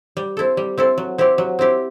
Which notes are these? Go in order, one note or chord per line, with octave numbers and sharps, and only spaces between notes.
G3
C4 E4 A4
G3
C4 E4 A4
F#3
C4 E4 G4
F#3
C4 E4 G4